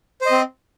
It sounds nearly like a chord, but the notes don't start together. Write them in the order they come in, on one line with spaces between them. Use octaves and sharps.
C5 D#5 C4